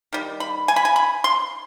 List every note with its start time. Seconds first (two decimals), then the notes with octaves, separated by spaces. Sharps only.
0.13 D#3 G3
0.40 B5
0.68 G#5
0.76 B5
0.85 G#5
0.96 B5
1.24 C6